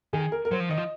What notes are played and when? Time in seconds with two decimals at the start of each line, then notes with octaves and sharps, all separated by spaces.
0.13 D#3 G#4
0.32 A#4
0.45 A#4
0.51 F#3 C5
0.60 F3
0.69 D#3 D#5
0.78 F3